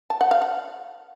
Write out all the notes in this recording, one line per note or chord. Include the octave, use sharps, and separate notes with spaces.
A5
F#5
F5
F#5